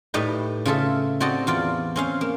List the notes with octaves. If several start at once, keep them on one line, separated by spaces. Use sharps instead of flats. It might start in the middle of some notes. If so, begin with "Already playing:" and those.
A2 G3 D#4 G4 B4
C#3 F4 A4 E5
C4 F#4 G4 D5 D#5 A5
E2 F4 D5
C4 C#4 F5
A#3